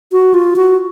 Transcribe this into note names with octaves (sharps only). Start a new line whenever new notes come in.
F#4
F4
F#4